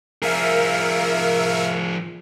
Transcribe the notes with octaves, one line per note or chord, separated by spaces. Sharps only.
F3 G#4 A#4 E5 F5